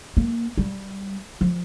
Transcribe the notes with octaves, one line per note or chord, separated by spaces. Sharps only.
A#3
G3
F3